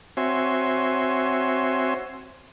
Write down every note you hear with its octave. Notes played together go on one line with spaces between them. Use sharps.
C4 F#4 C#5 E5 G#5 C6